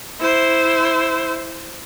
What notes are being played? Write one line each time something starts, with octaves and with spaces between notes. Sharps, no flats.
E4 C5